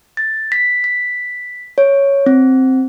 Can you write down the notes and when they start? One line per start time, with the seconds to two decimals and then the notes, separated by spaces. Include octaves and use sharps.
0.17 A6
0.52 B6
0.84 B6
1.78 C#5
2.26 C4